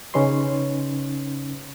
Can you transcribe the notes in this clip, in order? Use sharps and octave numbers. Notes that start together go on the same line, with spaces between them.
C#3 C#4 D#4 B4 C6